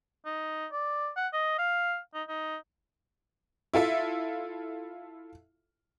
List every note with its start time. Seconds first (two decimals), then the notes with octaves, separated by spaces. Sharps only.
0.26 D#4
0.72 D5
1.16 F#5
1.33 D#5
1.58 F5
2.14 D#4
2.29 D#4
3.73 E4 F4 A4 E5